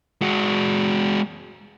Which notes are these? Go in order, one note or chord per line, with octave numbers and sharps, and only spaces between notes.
G#3 F#4